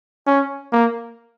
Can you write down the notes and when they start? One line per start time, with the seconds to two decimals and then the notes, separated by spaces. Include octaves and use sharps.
0.27 C#4
0.72 A#3